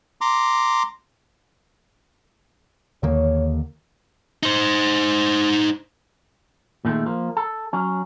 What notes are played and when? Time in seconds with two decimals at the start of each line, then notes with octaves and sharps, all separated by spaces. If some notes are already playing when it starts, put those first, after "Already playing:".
0.21 A#5 C6 D6
3.03 D#2 D3 D#3 A#3 C#5
4.43 D#4 C5
6.85 A#2 D3 D#3 G#3 A3
7.06 F3 A#3
7.37 A4
7.73 F#3 C#4